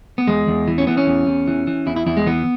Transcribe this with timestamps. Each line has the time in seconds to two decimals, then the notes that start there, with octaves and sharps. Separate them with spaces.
0.18 B3
0.27 E2 G#3
0.47 E2
0.68 E3
0.78 C#4
0.87 E3 B3
0.97 C#4
1.07 E2
1.27 E2
1.48 E3
1.67 E3
1.86 E2 E4
1.96 E4
2.06 E2 E4
2.17 G#3
2.26 E3 B3